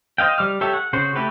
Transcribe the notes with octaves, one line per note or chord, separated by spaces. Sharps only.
C5 D#5 F5 G5
G3 D6 F6
G4 A4 C#5 E5
F#5
C#3 F#4 C5
A3 E4 F#4 G4 B4